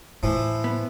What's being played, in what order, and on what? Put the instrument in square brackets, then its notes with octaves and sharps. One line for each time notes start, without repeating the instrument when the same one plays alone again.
[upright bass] A2 [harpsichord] E3 F3
[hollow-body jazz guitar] B3